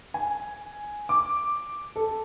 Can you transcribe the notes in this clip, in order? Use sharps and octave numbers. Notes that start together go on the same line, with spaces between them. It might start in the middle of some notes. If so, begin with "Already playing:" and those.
G#5
D6
A4